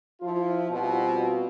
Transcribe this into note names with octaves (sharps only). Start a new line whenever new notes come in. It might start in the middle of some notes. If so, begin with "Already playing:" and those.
F3 E4 F4
B2 G3 C4 F4 F#4